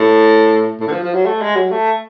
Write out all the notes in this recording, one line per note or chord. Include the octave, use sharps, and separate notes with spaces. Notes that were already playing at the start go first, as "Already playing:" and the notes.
Already playing: A2
A2
D3
F3
F3
F#3
A3
G#3
F#3
A3